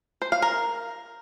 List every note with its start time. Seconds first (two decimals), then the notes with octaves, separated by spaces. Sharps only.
0.22 C5
0.32 F5
0.42 A#4